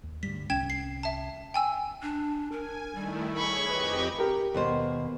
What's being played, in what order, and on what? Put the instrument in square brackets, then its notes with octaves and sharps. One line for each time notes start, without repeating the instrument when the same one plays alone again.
[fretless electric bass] D#2
[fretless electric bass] D2 G2 G3 [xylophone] B6
[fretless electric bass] C2 C#4 [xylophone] G5 G#6 E7
[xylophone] C7
E5 A5
G5 G#5 E6
[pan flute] D4
[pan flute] A#4 [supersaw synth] G#5
[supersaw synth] D#3 A3 E4 [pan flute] G3
[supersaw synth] G#4 C#5 [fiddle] B5 C#6
[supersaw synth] F2 G4 D#5 [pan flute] B4
[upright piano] G4 A#4
[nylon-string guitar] D#2 B2 C5